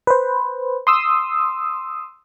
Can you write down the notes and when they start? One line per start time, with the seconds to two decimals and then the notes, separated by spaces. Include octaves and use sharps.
0.07 B4 C5
0.87 C6 D#6 E6